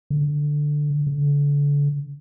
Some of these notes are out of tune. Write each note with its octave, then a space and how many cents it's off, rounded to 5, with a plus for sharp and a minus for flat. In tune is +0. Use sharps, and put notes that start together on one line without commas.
D3 +5
D3 -35